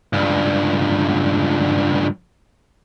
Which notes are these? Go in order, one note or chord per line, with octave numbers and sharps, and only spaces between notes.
C#2 G2